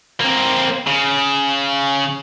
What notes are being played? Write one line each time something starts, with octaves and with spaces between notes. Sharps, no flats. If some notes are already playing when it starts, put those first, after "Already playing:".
A#3 C4
C#3